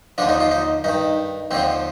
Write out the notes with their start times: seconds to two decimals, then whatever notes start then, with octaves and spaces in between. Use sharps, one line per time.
0.18 D#2 D3 F3 D4
0.29 D#4
0.40 F4
0.51 D#4
0.84 G2 D#3 D#4
1.51 D#2 D3 F3 C4